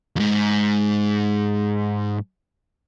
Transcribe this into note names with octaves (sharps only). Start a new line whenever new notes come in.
F2 G#2